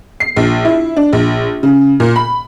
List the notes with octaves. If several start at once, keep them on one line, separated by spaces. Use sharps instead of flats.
C7
A#1
E4
D4
A#1
C#3
A#2
B5